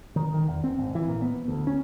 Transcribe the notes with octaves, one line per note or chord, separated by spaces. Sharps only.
D#3
D#3
E2
C4
G#1
E3
A#2
B3
D2
C#4